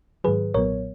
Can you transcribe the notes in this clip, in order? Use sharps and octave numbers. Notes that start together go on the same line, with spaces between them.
G#2 D#3 F#3 G#4 B4
B1 A#2 F#3 B3 A#4 C#5